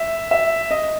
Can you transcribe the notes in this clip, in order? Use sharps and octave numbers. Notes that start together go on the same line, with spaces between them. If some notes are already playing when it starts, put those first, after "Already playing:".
Already playing: E5
E5
D#5